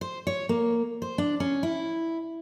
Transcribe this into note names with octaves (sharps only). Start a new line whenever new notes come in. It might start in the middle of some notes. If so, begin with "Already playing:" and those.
C5
C#5
A#3
C5
D4
C#4
E4